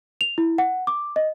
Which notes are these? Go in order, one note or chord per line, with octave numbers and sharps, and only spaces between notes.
F7
E4
F#5
D6
D#5